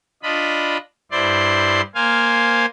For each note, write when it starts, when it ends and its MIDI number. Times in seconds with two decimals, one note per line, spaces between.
0.23 0.77 62
0.23 0.77 65
0.23 0.77 75
0.23 0.77 83
1.11 1.81 43
1.11 1.81 64
1.11 1.81 72
1.11 1.81 74
1.11 1.81 84
1.95 2.66 58
1.95 2.66 72
1.95 2.66 77
1.95 2.66 80